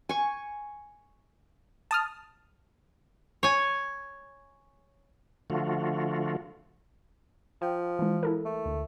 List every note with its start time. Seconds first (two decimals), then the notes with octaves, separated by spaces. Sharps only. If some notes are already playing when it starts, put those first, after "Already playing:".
0.09 G#5 C#6
1.91 A5 D#6 F6
3.43 C#5 G#5
5.50 D3 F3 A3 F4 F#4
7.62 F3 G5
7.99 E3 G#3
8.23 E4 A4 A#4
8.45 A3
8.66 D2